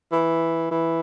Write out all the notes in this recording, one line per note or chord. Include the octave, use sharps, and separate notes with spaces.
E3
E3